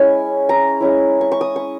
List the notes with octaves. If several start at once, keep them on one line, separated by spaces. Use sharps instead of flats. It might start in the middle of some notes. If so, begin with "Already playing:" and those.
Already playing: G#3 C#4 E4 G#5
A#5
G#3 C#4 E4
C#6
C#6
D#6
C#6